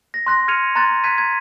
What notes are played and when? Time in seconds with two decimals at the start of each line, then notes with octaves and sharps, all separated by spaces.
0.14 A#6
0.27 C6 F#6 A#6
0.48 F6 G#6 C#7 D#7 F7
0.75 A#5 C6 F#6 A6
1.04 A#5 F#6 G#6 B6 D#7
1.18 G#6